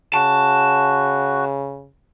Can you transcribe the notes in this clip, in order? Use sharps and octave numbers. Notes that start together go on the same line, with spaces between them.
C#3 F#4 A5